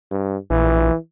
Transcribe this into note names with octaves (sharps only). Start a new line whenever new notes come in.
G2
A#1 E3